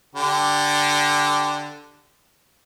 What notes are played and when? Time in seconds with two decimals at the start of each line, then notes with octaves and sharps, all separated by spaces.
0.16 D3 G4